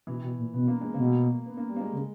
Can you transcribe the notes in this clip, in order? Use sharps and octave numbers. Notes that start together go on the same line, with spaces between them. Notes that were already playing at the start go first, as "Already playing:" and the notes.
B2 E3
B2
A#2
B2 B3
A#3
G#3
C#3 A#3
B2
B3
A#3
G3
A#3
G#3
C#3